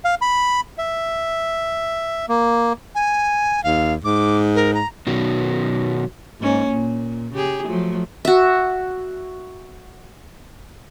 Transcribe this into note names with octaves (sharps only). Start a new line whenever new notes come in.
F5
B5
E5
A#3
G#5
D#2 F5
G#2 D6
A#4
A#5
B2 D#3 F#3
G#2 A#3 C#4
A#2
C#3 G4 G#4
F3 F#3 A3
F#4 E5